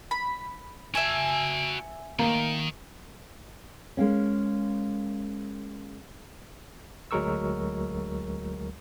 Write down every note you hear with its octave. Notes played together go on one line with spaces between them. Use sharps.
B5
F#4 E5 G#5 A5
D#3 A#3
G#3 A#3 C#4
D2 F#3 G#3 A#4 C#6 E6